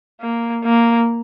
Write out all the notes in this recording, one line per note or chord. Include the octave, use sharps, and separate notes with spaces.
A#3
A#3